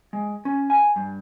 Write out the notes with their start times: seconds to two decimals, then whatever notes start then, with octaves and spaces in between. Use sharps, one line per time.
0.13 G#3
0.45 C#4
0.70 G#5
0.96 G2